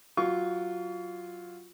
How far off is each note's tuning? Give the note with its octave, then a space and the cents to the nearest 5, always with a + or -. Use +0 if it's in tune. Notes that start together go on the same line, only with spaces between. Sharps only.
F#3 +0 F4 +0 C#6 +35